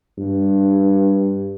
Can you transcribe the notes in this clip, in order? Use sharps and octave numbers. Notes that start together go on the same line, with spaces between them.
G2